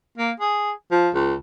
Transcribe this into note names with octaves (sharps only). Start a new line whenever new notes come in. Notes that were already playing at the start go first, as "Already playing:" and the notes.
A#3
G#4
F3
C#2